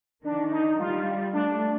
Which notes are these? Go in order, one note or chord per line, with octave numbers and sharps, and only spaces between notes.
D#3 D4
D#4
G3 F4
A3 D4